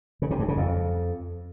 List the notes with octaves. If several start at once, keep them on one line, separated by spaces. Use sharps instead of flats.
C#3
C3
G2
C#3
F2